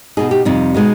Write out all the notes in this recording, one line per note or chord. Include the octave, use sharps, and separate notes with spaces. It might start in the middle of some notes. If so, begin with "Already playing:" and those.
B2 B3 D#4 G#4
G4
F2 C3 G3 D#4
B2 G#3 B3 D#4